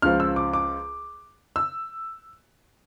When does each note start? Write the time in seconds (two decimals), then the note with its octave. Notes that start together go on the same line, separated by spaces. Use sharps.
0.02 C#2 C#3 F3 F6
0.20 E6
0.36 D6
0.53 D6
1.56 E6